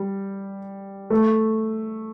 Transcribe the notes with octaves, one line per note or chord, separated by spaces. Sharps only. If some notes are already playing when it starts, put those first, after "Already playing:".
Already playing: G3
A3